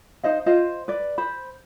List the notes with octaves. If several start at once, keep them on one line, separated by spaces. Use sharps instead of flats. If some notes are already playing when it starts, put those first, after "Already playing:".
D#4 C5 D#5 F5
F4 C5 D#5 F5
B4 D5
C5 B5